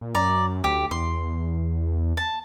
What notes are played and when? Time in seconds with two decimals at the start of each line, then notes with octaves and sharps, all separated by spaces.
0.01 A#2
0.15 F#2 D5 A#5
0.64 D2 G4
0.91 E2 C6
2.17 A5